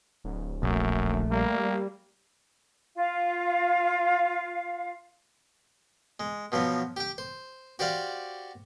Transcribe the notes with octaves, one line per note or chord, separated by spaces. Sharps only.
D1
A#1 F#2 A3
G3 A#3
F4 F5
G#3
B2 F3 F#3 B3
G4 G5
C5
F#4 G4 C5 D5 F5 F#5